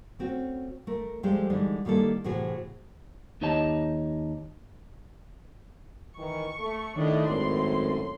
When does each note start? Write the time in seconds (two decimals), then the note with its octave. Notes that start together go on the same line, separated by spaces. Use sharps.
0.19 A3 C4 C#4 F#4
0.87 A3 A#4
1.23 F3 G3 G#3 G4 A4 C5
1.50 D3 E3 G3 G#3 D#4
1.85 D#3 G3 A#3 E4 A4
2.24 A2 C3 E3 F#4 G#4
3.41 D#2 D#4 G4 C#5 D#5 A5
6.17 D#3 E3 C#6
6.59 A3
6.96 A2 D#3 D4 D#5
7.28 G#1 F#2 A2 C6